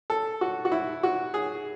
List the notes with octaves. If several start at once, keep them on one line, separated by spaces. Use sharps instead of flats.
A4
F#4
F#4
E4
F#4
G#4